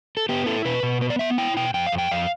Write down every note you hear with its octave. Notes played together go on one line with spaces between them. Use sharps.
A4
B3 G4
E4 A4
B2 B4
B2
B3 B4
D5
B3 E5
E4 G5
B2 G5
F2 G5
F5
F2
G5
F2 F5